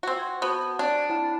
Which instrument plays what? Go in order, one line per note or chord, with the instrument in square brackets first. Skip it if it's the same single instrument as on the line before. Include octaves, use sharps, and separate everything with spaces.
[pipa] C4 F#4
[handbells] G#6
[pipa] B3 [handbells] F#4 C5 A5
[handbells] C4 C#5 D5 [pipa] D4
[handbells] E4 F#5 A5